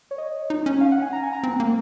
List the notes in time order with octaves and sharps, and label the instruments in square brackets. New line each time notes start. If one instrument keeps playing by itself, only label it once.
[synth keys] C#5
D#5
[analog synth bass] D#4
C#4
[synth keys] F5
F#5
G#5
A#5
G#5
A#5
[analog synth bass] C4
A#3